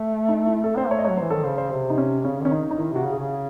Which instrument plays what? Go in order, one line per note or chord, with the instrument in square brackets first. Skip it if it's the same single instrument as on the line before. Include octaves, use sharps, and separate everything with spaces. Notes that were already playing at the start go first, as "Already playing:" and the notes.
Already playing: [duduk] A3
[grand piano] D#4
E4
[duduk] A3 [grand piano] A4
[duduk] C4 [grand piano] C5
[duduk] A3 [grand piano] C#5
[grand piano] D#5
C#5
[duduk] F#3
[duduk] E3 [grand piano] C5
[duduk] D#3 [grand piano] A4
[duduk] C#3 [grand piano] C5
[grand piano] C5
[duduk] C3 [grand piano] C5
[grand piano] D#4
C#4
[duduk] C#3 [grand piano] C#4
[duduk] D#3 [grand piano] C#4
[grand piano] D#4
D#4
[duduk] D#3 [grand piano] E4
[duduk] C3 [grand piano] F#4
[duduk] C#3
[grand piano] G#4
[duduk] C#3